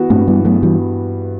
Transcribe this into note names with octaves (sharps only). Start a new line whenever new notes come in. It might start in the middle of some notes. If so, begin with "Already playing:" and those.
Already playing: E3 B3 F#4
G2 A3 C4
E3 G3 B3
F#3 A3 B3
E3 G3 F#4